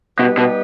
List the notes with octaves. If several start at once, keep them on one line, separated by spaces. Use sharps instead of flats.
B2 G3 B3 D#4 G4 B4
B2